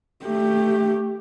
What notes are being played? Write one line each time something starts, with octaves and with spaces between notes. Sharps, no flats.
A3 G4